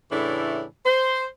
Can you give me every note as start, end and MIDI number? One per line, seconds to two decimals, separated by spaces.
0.12 0.64 45
0.12 0.64 49
0.12 0.64 52
0.12 0.64 57
0.12 0.64 62
0.12 0.64 64
0.86 1.25 72